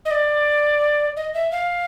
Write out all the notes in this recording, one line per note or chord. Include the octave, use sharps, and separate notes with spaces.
D#5
D5
D#5
E5
F5